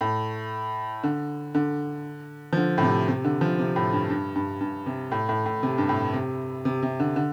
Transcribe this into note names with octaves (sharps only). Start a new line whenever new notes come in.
A2
D3
D3
F3
D3
A2
C3
C3
D3
F3
C3
A2
G2
G2
G2
G2
C3
A2
A2
A2
C3
G2
A2
C3
C3
C3
D3
D3